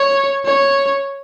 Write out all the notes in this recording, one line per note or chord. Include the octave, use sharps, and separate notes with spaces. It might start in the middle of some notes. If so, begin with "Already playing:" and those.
Already playing: C#5
C#5